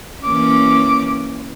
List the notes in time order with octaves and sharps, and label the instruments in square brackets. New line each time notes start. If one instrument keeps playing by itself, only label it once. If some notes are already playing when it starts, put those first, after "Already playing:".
[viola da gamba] E3 A#3 C#4 [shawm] D6